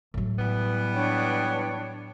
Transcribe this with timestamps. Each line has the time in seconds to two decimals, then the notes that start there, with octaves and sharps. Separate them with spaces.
0.14 A2 F#3
0.39 E3 G3 B3
0.94 D4 C#5 G5